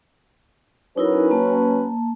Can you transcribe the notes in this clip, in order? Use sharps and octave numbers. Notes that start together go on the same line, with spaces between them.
F#3 C#4 D#4 E4 A#4 B4
A#3 A5